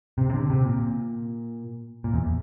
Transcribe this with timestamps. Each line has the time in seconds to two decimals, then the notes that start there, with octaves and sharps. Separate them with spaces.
0.18 C3
0.30 C3
0.34 D3
0.50 C3
0.65 A#2
2.04 A#2
2.14 E2